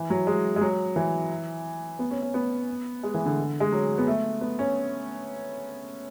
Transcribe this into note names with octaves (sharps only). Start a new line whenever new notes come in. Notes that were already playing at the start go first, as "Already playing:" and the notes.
Already playing: E3
F#3
G#3
G#3
F#3
E3
B3
C#4
C#4
B3
G#3
E3
D3
G#3
F#3
B3
A3
B3
C#4